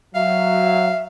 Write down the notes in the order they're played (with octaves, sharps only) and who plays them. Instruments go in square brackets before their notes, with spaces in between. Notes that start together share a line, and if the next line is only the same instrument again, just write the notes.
[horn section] F#3 [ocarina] E5 [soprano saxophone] F5